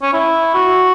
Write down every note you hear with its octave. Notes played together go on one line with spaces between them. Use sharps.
C#4
E4
F#4